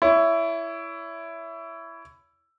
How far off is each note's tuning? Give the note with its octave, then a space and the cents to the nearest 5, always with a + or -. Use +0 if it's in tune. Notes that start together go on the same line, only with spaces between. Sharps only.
E4 +10 C#5 +30